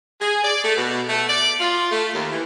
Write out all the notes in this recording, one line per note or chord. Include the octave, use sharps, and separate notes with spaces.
G#4
D5
A3
B2
A3
D5
F4
A3
D#2
E3